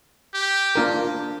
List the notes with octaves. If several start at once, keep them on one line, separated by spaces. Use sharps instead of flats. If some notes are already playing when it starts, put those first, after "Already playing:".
G4
A#3 D4 F4 A#4